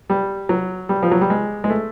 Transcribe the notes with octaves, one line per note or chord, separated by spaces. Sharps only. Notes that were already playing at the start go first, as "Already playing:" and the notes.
G3
F#3
G3
F3
F#3
G3
G#3
G#3
A3